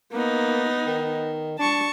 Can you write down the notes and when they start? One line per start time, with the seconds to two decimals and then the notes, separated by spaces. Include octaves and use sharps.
0.13 A#3 B3 D#4
0.87 D#3
1.59 D4 A5 C#6